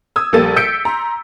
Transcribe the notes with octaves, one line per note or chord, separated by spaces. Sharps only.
D#6 E6 G#6
A#1 G3 A#3 A4 A6 D#7
E6 G6 B6 C#7 D7
A#5 C6